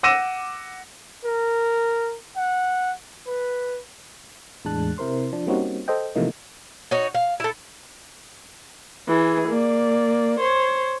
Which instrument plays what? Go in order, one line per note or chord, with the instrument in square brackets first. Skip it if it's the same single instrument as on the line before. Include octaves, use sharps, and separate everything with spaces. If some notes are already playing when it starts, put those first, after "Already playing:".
[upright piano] F#5 D6 E6 A#6 D#7 E7
[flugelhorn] A#4
F#5
B4
[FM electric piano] E2 A2 G#3 D4 A5 F#6
C3 E4 A#4 C5 C6
F3 D4
G3 A#3 C4 C#4 D#4 F#4
A4 C5 D#5 G5
C3 E3 F3 A3 A#3 D#4
[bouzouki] D#4 F#4 C#5
F5
E4 A4
[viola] E3 G#4
A#3 D5
C5 C#5